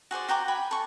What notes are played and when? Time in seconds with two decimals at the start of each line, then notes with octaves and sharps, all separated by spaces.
0.11 F#4 G#4 C5 D5
0.29 F#4 G5 A#5 D6
0.48 G5 G#5 B5
0.71 A4 C#6